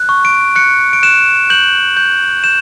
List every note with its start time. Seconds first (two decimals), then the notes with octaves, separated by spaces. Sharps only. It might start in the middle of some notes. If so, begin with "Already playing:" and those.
Already playing: F#6
0.09 C#6
0.25 D7
0.56 F#6 C#7
0.93 D7
1.03 F#6 E7
1.50 G6 F#7
1.97 G6
2.44 G6 E7